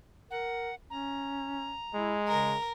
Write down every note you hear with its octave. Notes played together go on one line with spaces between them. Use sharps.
A#4 F#5
C#4 A#5
G#3 E4
C#3 A#4